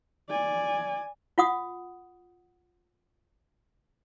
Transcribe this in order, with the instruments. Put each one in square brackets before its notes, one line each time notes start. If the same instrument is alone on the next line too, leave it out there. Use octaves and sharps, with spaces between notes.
[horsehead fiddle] D5 G#5
[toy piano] F4 F#5 D#6